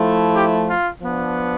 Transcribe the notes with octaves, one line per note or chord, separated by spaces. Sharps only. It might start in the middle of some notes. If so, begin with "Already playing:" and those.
Already playing: F3 A3 E4
G4
F4
F3 B3 D4